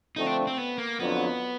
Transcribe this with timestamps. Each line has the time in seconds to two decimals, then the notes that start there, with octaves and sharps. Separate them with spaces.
0.16 D3 F3 A3 C4 D#4
0.27 D4
0.47 C4
0.58 B3
0.78 A#3
0.99 F2 D3 F#3 B3